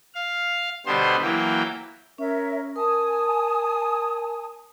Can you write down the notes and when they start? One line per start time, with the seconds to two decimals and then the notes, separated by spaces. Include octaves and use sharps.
0.14 F5
0.86 B2 D3 G3 B3 C5 C6
1.22 E3 F#3 A#3 G5
2.18 C#4 A#4 C#5 E5
2.76 A#4 G#5 A5 D#6